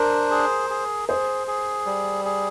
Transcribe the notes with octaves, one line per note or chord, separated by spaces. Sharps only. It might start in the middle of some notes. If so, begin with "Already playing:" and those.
Already playing: D4 A#4 C5
G#4
G#4
G#4 C5
G#4
G3
G#4